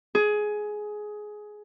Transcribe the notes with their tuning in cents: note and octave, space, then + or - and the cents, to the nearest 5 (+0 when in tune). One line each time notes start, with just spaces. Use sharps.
G#4 +15